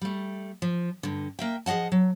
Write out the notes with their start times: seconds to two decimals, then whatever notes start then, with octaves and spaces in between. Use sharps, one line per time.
0.01 G3 A3
0.62 F3
1.03 G2 D3
1.39 A#3 E5 G5
1.66 F3 G#4 D#5 F#5 A5
1.92 F#3